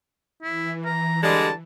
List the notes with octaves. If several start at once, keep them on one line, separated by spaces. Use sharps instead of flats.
E3 E4
A#5
D3 G3 G#3 A5